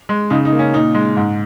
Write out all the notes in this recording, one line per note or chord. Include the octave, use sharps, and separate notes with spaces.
G#3
C#3 D#4
D#4
A#3
C#4
A#2 D#4
G#3
G#2